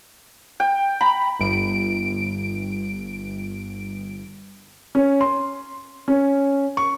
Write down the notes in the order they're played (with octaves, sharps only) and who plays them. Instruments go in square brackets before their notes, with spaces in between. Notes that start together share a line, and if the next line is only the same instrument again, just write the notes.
[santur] G5
A#5 B5
[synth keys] G1 D7
[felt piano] C#4
C6
C#4
C#6